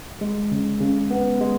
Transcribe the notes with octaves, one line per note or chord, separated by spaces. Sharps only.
G#3
C#3
C#3
B3
G#3